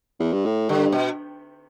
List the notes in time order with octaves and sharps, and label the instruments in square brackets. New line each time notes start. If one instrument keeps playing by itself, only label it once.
[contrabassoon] E2
G2
A2
[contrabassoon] G2 [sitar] D3
[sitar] B2